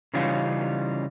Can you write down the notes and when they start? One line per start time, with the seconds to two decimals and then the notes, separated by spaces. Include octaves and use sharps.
0.14 C#3 E3 G3 C#4 D#4 F4